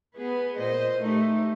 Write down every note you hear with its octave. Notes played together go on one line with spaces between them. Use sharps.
B3 G#4 B4
A#2 C5 D#5
A3 D#4 G4